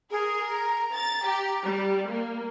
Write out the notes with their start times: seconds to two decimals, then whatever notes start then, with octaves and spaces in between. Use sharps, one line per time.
0.11 G#4 A#4
0.51 A#5
0.94 A6
1.25 G4
1.64 G3
2.10 A#3